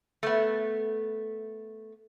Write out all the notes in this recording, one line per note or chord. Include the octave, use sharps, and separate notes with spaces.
A3 B3